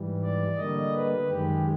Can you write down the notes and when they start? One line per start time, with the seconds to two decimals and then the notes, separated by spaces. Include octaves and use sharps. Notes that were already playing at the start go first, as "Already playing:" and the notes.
Already playing: G#2 E3 G3
0.23 D5
0.57 D3 G3 A#3 D#5
0.93 B4
1.28 F#2 D#3 G#3 G4